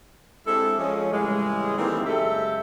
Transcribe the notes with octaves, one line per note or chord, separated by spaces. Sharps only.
G#3 C4 D4 E4 G4 A4
F3 G#3 C#4
A2 C#3 E3 G3 G#3
D#3 E3 G3 A3 A#3 C4
F#2 C#3 G#3 G4 A4 E5